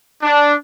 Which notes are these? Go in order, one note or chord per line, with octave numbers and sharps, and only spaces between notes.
D4